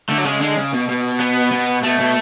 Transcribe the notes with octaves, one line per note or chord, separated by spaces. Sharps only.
D3 A3
F#3
C#3 G#3
D3 G#3
C#3
B2
B2
B3
B2
B2 A3
B2